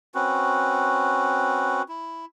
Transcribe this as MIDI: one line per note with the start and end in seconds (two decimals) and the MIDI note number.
0.15 1.82 60
0.15 1.82 61
0.15 1.82 66
0.15 1.82 71
1.89 2.25 64